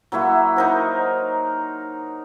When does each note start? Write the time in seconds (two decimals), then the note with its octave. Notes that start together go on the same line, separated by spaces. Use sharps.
0.12 F#3 A#3 E4 F#4
0.56 D#4 A#4 C5